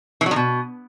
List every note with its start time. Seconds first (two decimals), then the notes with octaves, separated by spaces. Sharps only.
0.21 E3
0.26 F#3
0.31 D#3
0.36 B2